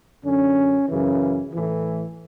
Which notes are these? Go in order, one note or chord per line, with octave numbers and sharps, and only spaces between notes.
F#2 D3 C#4
F#2 C#3 E3
A2 E3